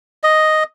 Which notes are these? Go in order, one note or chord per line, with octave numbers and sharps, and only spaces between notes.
D#5